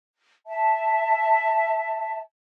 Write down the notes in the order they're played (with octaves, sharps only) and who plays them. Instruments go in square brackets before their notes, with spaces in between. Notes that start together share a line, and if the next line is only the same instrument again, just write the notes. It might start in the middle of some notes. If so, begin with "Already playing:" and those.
[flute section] E5 A5